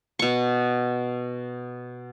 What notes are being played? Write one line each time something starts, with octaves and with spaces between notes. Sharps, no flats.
B2 C#6